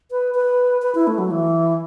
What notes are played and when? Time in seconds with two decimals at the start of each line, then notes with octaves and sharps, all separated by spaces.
0.11 B4
0.35 B4
0.82 B4
0.95 E4
1.07 A3
1.18 F#3
1.31 E3